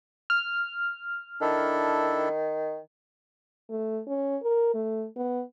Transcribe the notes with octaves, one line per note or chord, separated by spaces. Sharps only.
F6
D#3 D4 E4 A4
A3
C#4
A#4
A3
B3